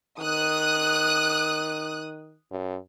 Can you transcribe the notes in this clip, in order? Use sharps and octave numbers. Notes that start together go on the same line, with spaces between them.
D#3 D#6 F#6
F#2